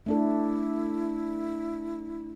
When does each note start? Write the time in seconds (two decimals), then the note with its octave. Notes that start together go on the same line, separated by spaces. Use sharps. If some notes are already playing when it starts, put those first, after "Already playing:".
0.06 A3 D4 E4 A4